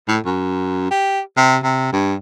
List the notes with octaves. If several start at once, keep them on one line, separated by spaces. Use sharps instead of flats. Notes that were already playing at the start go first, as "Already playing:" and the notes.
A2
F#2
G4
C3
C3
G2